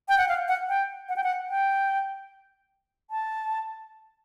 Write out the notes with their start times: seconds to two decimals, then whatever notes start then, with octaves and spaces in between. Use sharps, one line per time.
0.09 G5
0.18 F#5
0.29 F5
0.48 F#5
0.69 G5
1.09 F#5
1.16 G5
1.24 F#5
1.49 G5
3.11 A5